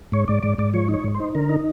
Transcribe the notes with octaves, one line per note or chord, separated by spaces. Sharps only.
G#2 C#5
G#2 D5
G#2 D5
G#2 D5
F3 C#5
D#4
C#5
G#2
C5
D#4
D3 A#4
D#4